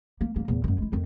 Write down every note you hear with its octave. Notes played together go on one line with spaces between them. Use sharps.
A#3
C#2 A#3
E2 A#2
F#2 D#3
G#3 E4
F2 D#3